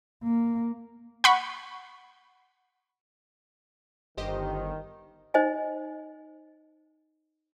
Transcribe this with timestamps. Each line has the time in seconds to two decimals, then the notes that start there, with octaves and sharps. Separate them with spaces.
0.23 A#3
1.24 F#5 B5 C#6
4.17 G1 D#3 G4 C5 D#5
5.34 D#4 C5 D#5 G#5